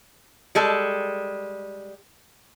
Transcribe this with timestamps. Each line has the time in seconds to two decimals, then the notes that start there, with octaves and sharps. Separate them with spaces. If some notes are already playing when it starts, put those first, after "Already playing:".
0.55 G3 G#3 A4